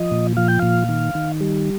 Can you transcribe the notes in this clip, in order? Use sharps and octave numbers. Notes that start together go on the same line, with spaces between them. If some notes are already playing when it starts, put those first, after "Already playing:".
Already playing: F3 D#5
A#2
F3 F5
G5
A#2 F5
D#3
D#3
G3